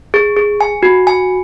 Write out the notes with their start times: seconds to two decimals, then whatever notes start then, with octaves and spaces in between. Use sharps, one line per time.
0.14 G#4
0.37 G#4
0.61 G#5
0.83 F#4
1.07 G#5